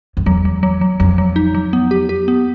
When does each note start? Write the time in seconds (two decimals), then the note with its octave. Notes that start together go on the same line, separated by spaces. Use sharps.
0.17 F2
0.26 E2 F#3
0.45 F#3
0.63 F#3
0.81 F#3
1.00 F2 F#3
1.18 F#3
1.36 D#4
1.55 F#3
1.73 B3
1.91 G4
2.09 G4
2.28 B3